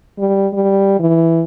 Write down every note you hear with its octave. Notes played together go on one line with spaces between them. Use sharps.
G3
G3
E3